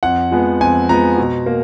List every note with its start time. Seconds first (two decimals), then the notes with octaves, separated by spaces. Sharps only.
0.03 F2 F#5
0.31 F3 G#3 B3
0.61 F2 G#5
0.89 F3 G#3 B3 A#5
1.18 B2
1.46 A#3